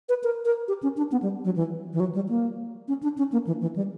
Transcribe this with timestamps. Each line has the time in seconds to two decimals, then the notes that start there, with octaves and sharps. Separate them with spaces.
0.09 B4
0.24 A#4
0.45 A#4
0.68 G4
0.83 C#4
0.97 D4
1.12 B3
1.22 G3
1.45 F#3
1.56 E3
1.93 E3
2.00 F#3
2.15 G3
2.29 A#3
2.88 C#4
3.03 D4
3.18 C#4
3.32 A#3
3.47 E3
3.62 E3
3.76 G3